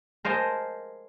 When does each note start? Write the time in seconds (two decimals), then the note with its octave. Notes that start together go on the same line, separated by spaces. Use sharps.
0.25 A#4 C5 D#5 F5 G#5 A5